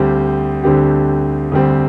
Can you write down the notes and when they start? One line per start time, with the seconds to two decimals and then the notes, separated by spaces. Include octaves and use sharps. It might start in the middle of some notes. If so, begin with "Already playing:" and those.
Already playing: D2 D3 G3 C4 G4
0.63 D2 D3 G3 C4 G4
1.52 D2 D3 G3 C4 G4